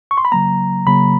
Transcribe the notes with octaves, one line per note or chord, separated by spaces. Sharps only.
C#6
C6
B5
C#3 F#3 A#3 A#5
C#3 F#3 A#3 B5